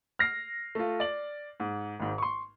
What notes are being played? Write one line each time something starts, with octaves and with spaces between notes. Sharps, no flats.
F6 A#6 C7
A3 F4
D5 F#7
G#2
G#1 G#2
C6 C#6